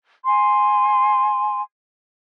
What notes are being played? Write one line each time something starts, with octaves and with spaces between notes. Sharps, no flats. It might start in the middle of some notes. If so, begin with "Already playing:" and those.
G#5 C6